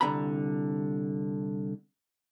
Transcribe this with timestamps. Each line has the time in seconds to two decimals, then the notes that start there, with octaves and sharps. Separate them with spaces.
0.01 C2 D3 A#5 B5